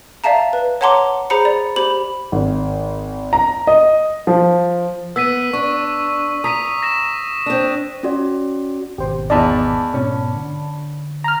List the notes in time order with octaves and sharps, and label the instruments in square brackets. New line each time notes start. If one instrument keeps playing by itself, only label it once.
[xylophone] D5 E5 F5 A5 A#5
B4
C#5 F#5 A5 A#5 C6 D6
G#4 C5 A#5 B5 C#7
D5
G4 C5 B5 F#7
[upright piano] G#1
A#5
D#5
F3
[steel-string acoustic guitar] B3 [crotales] E6 B6 D#7
[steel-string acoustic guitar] D4 [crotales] C#6
[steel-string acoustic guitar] A#5 [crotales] D#6 B6 D#7
[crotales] A#6 B6 E7
[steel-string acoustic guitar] C4 D4
[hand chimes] C#4 F#4 D5
[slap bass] G#1 B2 [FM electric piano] G4 C5
[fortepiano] E2 D#4 [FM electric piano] D5 A5 B5
[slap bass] G#2 B2 B3 [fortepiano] C#4
[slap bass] D3 D4
[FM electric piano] A#5 F6